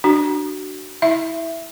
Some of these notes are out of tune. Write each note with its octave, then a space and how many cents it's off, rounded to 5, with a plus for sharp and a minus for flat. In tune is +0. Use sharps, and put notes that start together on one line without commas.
D4 +25 F#4 +20
E4 -20 E5 +10